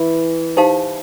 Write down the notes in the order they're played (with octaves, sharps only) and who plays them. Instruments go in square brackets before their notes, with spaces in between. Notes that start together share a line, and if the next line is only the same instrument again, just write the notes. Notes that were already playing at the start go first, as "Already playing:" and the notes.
Already playing: [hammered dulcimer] E3
[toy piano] D#4 G4 C5 F5 A5